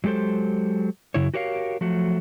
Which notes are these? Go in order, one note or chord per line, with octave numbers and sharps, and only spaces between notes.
F#3 G#3 G4 A4 C5
F#2 C#3 E4 C#5
F#4 G4 A#4 C#5 D5 F5
F3 F#3 A3 F#4